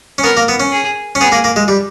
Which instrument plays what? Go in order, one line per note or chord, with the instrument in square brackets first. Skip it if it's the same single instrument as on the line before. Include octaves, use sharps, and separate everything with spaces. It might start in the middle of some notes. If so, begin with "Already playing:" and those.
[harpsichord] C#4
[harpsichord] B3 [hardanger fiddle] A#4
[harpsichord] A#3
B3
C#4
[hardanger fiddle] G#4
[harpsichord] C#4
[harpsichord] B3 [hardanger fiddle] G#4
[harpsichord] A#3
A#3
G#3
G3